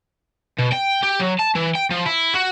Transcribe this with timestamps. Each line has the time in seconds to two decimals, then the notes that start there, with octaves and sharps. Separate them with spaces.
0.59 B2
0.73 G5
1.03 G4
1.20 F#3
1.39 A5
1.55 E3
1.75 G5
1.91 F3
2.06 E4
2.35 F#4